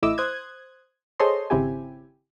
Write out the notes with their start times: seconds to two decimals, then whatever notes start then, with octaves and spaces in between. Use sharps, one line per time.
0.02 A1 A3 E4 D#5 D6 E6
0.18 C5 D#6 F#6 G#6
1.20 G#4 A4 C5 C#5 D#5 C6
1.50 G#1 C#3 C4 E4 G4 G#5